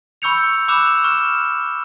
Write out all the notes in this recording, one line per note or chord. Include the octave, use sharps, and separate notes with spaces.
B5 C#6 E6 G6 C#7 F7
B5 D6 E6 F#6 E7
C#6 F6 E7